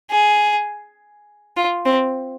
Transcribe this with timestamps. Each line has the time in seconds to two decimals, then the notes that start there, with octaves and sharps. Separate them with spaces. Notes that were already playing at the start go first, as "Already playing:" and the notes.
0.11 G#4
1.57 F4
1.86 C4